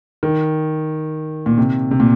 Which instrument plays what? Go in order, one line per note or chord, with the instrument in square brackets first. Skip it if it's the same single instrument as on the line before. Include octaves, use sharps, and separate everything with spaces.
[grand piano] D#3
A#2
C3
C3
A#2